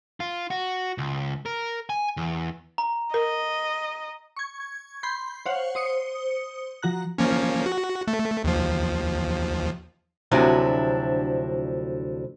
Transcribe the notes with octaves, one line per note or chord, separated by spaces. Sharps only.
F4
F#4
C#2
A#4
G#5
E2
A#5
A#4 D#5
C#6 G#6
B5 C6 G6
C5 C#5 F5 F#5
C5 D#6 C#7
F3 F#4 A#5 F#6
F3 A#3 C#4
F#4
A3
D#2 F3
D2 C3 F3 F#3 D4 E4